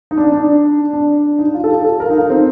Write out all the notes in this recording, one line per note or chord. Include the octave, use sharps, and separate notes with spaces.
D#4
D4
D4
D4
D#4
F4
A4
G4
A4
A#4
F4
D#4
D#4
C4